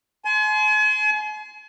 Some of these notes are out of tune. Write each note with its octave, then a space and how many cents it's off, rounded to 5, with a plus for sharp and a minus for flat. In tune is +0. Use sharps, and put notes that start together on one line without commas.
G#5 +40 C6 -15